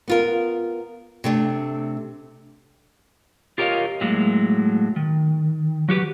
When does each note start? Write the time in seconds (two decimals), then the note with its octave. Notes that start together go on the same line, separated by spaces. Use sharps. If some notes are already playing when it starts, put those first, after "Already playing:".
0.08 B3 F4 A#4
1.24 C3 A3 D4
3.58 F4 G4 A#4 C#5 D#5 F5
4.01 A2 F#3 G#3 A#3
4.96 D#3
5.89 F#3 F#4 G4 B4